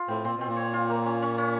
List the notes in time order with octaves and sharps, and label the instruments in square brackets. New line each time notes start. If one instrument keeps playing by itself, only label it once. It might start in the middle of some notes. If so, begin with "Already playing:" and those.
Already playing: [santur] F4
[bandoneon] A2 [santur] C4
[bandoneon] A#2 [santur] C4
[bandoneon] B2 [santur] C4
[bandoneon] A#2
[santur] C#5
F4
A#3
C#4
C#4
C#4